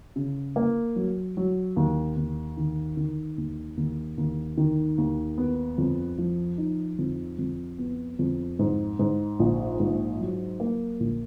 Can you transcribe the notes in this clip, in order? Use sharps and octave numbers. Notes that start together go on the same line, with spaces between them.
C#3
A#3
F#3
F#3
D#2
D#2
D#3
D#3
D#2
D#2
D#2
D#3
D#2
B3
F2
F3
D#4
F2
F2
B3
F2
G#2
G#2
A#1
G#2
F#3
A#3
A#1